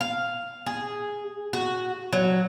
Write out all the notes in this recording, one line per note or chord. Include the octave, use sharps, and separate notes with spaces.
F5
G#4
F#4
F#3